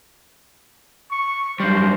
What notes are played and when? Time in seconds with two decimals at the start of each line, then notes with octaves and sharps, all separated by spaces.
1.11 C#6
1.60 F#2 G3 C5